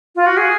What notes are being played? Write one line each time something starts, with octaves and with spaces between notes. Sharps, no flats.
F4
F#4
G#4